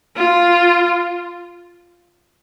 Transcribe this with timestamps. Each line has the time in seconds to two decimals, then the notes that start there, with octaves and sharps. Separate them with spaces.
0.16 F4